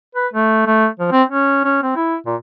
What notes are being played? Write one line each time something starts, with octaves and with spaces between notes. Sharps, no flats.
B4
A3
A3
F3
C4
C#4
C#4
C4
E4
A#2